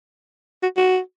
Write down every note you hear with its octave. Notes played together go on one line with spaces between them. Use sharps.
F#4
F#4